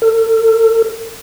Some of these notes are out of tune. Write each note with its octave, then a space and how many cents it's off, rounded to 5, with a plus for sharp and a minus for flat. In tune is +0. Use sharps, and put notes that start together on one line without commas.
A4 +40